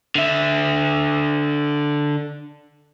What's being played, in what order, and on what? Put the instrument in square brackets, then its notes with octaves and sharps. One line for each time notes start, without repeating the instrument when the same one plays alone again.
[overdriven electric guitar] D3 E5